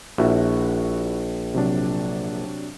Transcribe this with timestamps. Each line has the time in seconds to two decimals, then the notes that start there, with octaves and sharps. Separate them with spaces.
0.18 A#1 E4 F#4 E5
1.54 C3 F#3 D4